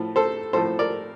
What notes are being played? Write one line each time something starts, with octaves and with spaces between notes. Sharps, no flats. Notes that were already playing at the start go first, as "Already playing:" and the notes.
Already playing: A2 F3 A3
A4 C5
A2 F3 A3 A4 C5
A#4 D5